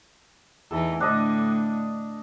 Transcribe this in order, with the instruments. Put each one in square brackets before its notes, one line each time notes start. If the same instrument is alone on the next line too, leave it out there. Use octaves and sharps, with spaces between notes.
[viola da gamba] E2 D#4 [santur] A4
[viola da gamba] A2 D3 [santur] D4 D#5